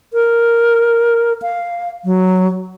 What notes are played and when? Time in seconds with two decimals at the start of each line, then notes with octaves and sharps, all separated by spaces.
0.13 A#4
1.42 F5
2.05 F#3